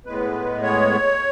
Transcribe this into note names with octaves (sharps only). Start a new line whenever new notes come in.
A2 G#3 B3 B4
C#5